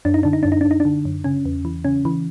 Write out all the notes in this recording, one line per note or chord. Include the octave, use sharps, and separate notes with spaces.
F#2 D4
D#4
D3 D4
D#4
F#2 D4
D#4
F#2 D4
D#4
D4
D3
F#2
C#3 C#4
E2
E3
C#3 C#4
E3